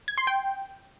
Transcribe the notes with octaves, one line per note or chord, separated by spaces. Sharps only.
G#6
C6
G5